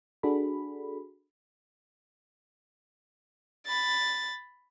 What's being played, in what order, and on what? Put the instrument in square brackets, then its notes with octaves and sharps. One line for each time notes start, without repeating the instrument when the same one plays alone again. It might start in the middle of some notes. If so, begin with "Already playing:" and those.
[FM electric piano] D4 F#4 G#4 A4 B5
[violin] B5 A6